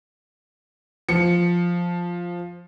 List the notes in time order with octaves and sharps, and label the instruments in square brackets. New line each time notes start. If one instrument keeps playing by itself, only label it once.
[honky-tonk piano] F3 C#7